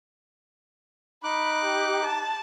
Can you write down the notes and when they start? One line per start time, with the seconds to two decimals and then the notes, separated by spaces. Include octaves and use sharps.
1.24 D#4 B5 D6 F#6
1.65 G4
2.05 A5